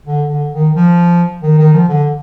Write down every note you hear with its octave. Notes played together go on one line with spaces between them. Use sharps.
D3
D3
D#3
F3
D#3
D#3
F3
D3